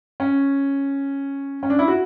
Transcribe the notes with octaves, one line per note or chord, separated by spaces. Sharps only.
C#4
C#4
D4
E4
F#4